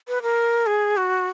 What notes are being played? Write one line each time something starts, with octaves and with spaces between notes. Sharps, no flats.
B4
A#4
G#4
F#4